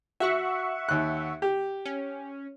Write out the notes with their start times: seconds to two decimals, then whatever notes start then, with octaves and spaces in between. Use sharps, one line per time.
0.20 F#4 E5 F#5 C#6
0.89 D#2 F#6
1.42 G4
1.86 C#4